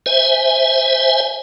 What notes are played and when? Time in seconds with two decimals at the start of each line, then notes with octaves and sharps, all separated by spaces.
0.06 C5 E5 G#5